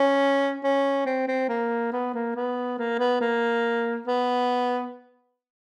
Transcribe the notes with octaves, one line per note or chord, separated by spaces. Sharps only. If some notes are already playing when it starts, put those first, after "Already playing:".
Already playing: C#4
C#4
C4
C4
A#3
B3
A#3
B3
A#3
B3
A#3
B3